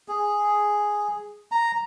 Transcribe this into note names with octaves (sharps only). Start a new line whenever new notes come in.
G#4
A#5